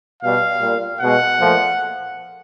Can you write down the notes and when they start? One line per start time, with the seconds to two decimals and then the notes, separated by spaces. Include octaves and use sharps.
0.21 B2 G3 F5
0.60 A#2 G3
1.00 B2 G#3 F#5
1.40 A#2 F3 A3